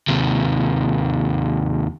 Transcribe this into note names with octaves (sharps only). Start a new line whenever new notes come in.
D#2 C3